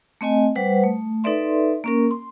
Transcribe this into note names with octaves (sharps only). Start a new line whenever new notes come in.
A3 C4 D#5 G#5
G3 B4 C5 F#5
A3
D#4 A4 B4 D5 E5 C6
A#3 C#4 A#4
C6